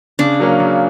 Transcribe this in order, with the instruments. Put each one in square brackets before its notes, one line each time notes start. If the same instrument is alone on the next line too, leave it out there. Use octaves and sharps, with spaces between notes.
[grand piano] C#3 [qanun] D4
[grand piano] F#3 A#3 C#4
C#3